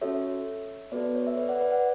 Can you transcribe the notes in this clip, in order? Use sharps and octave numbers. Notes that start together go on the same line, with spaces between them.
C#4 F#4 A4 C#5 E5
B3 F#4 A4 B4 D5
C#5
E5
B4 D5
D5 F#5
B4 D5
D5 F#5